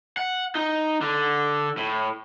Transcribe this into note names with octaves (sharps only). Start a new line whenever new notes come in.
F#5
D#4
D3
A2